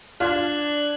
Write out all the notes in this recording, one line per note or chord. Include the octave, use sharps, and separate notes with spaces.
D4 F4 F#6 G#6